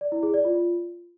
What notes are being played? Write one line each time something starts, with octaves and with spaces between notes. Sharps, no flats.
D5
E4
G#4
D5
F4